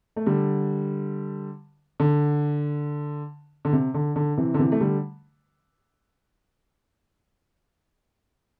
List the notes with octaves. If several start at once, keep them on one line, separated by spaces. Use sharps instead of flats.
A3
D3 G3
D3
D3
C3
D3
D3
C3 E3
D3
C3 E3
A3
D3 G3